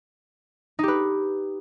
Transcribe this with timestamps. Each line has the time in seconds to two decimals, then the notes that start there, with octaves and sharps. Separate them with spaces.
0.79 D#4
0.83 G4
0.88 B4